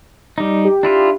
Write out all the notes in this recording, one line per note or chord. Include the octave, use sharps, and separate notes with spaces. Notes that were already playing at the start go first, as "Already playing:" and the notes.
G3 D#4
G4
D4 E4 F4